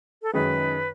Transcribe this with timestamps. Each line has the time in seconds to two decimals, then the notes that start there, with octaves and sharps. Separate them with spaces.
0.22 A4
0.33 F#2 D#3 G#3 D#4 B4